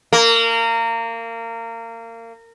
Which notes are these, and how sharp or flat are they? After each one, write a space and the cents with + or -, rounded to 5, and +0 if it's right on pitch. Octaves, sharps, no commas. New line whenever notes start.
A#3 -25